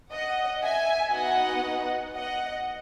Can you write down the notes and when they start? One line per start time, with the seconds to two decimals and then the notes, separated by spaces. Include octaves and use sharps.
0.11 D#5 F#5
0.62 E5 G#5
1.12 B3 D#4 F#4 D#5 F#5
2.14 D#5 F#5